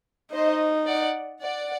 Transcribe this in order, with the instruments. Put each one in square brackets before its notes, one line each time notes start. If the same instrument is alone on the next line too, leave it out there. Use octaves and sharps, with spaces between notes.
[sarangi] D#4 [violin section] C5 D#5
[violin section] D5 F#5
D5 F#5